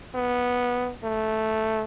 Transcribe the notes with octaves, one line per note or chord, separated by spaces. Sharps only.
B3
A3